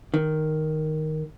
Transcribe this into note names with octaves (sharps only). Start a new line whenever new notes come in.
D#3